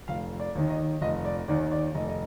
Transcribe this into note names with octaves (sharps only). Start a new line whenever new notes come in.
F1 F5
D5
D#2 D#3
D#5
F1 D#5
D5
D#2 D#3 D5
D5
F1 D#5
D#5